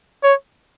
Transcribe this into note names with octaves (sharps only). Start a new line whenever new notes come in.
C#5